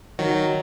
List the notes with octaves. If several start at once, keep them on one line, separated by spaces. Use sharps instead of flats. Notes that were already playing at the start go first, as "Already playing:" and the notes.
D#3 F#3